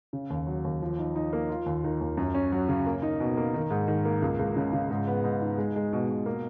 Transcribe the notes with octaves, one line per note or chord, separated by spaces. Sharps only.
C#3
D#2
F#3
D#2
F3
D#4
D#4
A#3
F4
D#2
D#3
D#2
F#2
C#4
F#3
C#3
A#3
D#4
B2
A#3
D#3
G#2
D#3
A#3
C#2
C#2
C#3
C#3
G#2
B3
G#2
D#4
G#3
G#3
B2
B2
A#3